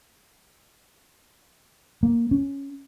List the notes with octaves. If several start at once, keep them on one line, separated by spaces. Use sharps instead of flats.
A#3
C#4